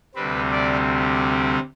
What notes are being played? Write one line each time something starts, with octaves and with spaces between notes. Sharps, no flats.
D2 C3 G3 C4 B4
D5